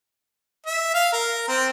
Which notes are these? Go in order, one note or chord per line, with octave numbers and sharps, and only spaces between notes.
E5
F5
A#4
C4